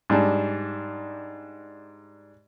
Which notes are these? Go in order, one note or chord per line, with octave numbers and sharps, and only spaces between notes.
G#2 G3 D4 A5